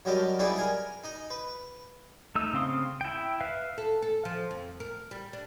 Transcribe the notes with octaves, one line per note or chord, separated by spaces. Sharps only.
F#2 F#3 G3 A#4 D#5 A5
G3 B3 D#4 E4 G#4 D5
A#4 G#5 A#5
D#4 D#5
B4
A3 D#4 E6
C#3 C4 F5 C6 D#6
E4 G5
B4 E5 F5
A4
A4
F3
F2
A#4
G3
D4